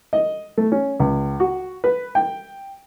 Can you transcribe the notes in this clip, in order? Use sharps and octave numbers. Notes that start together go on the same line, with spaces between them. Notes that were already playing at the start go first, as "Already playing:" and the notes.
D#5
A3
C#4
C#2
F#4
B4
G5